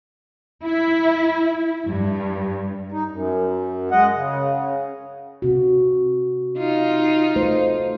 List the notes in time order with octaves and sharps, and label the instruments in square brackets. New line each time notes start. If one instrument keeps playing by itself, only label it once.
[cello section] E4
G2
[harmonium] D#4
F#2
G#3 D#5 F#5
C#3
[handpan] C3 F#4
[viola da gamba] D#4 F4
[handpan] A3 C5